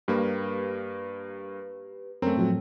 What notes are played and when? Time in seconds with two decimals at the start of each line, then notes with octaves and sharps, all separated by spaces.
0.08 G2 A#3 G4 B4
2.22 F#2 A3 C4 C#4 A#4
2.36 A2 F3 F#3